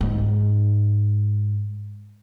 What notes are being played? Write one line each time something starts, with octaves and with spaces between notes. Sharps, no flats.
G#2